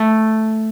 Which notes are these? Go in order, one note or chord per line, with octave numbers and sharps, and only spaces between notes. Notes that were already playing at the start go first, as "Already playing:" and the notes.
Already playing: A3